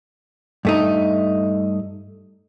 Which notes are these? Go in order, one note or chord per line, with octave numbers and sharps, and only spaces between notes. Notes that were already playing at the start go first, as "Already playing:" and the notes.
G2 A3 D#4